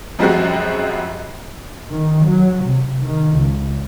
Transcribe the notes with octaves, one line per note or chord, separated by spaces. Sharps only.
F#2 F3 G3 G#3 C4 F#4
D#3
F#3
C3
D#3
C#2